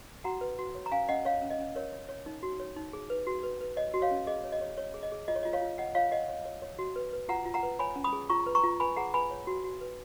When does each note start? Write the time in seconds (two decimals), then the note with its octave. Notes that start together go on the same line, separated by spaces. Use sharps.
0.24 F#4 F#5 A#5
0.41 B4
0.59 F#4
0.75 C#5
0.86 A#5
0.91 C#4 F5 G#5
1.09 C#4 D#5 F#5
1.25 C#4 C#5 F5
1.42 C#4
1.51 D#5
1.59 C#4
1.75 A#4 C#5
1.92 C#5
2.09 C#5
2.26 D#4
2.43 F#4
2.60 C#5
2.76 D#4
2.93 G#4
3.10 B4
3.27 F#4
3.43 B4
3.61 B4
3.76 C#5 D#5
3.94 F#4
4.02 C#5 F5
4.11 C#4
4.27 G#4 D#5
4.44 C#5
4.52 D#5
4.61 C#5
4.77 C#5
4.94 G#4
5.03 D#5
5.12 G#4
5.28 F4 D#5
5.35 C#5
5.43 F4 D#5
5.53 C#5 F5
5.62 F4
5.78 F4 D#5 F#5
5.95 F4 C#5 F5
6.11 C#5 D#5 F#5
6.29 C#5
6.45 C#5
6.62 C#5
6.79 F#4
6.96 B4
7.13 B4
7.29 F4 F#5 A#5
7.46 F4
7.54 F#5 A#5
7.63 B4
7.79 C#5 G#5 B5
7.96 C#4
8.04 B5 D#6
8.13 G#4
8.29 F4 A#5 C#6
8.46 B4
8.55 A#5 C#6
8.63 F4
8.80 B4 G#5 B5
8.97 G#4 F#5 A#5
9.14 B4 G#5 B5
9.31 C#5
9.47 F#4
9.64 F#4
9.81 B4